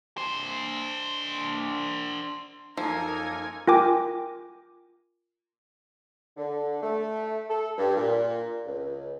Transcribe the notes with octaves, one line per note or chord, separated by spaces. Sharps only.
D4 C5
F#2 F3 A#3 D#4 A4 A#4 G#5
F4 A#4 G5 G#5 D6
D3
A3
A4
G2
A#2
C#2